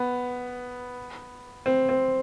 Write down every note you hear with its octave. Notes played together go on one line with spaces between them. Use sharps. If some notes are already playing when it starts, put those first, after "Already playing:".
Already playing: B3
C4
C4